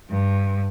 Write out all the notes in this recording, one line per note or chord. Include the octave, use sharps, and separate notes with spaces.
G2